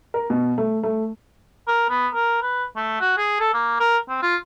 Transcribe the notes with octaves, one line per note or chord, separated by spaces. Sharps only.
A#4
B2
A3
A3
A#4
B3
A#4
B4
A3
F#4
G#4
A4
A#3
A#4
C4
F4